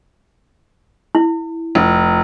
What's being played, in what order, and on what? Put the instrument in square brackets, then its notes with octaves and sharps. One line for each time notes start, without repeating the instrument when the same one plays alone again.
[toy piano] E4
[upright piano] F1